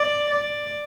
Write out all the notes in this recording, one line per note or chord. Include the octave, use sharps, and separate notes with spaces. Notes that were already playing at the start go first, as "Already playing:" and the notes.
Already playing: D5
D5